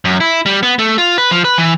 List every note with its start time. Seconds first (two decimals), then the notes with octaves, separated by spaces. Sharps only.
0.05 F#2
0.20 E4
0.46 G3
0.63 B3
0.79 A3
0.98 F4
1.18 B4
1.31 F3
1.44 B4
1.58 E3